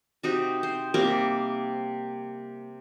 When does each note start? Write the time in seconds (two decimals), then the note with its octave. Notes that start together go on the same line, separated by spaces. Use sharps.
0.23 C3 D#4 F#4
0.63 C5
0.94 C3 G3 A#3 A#4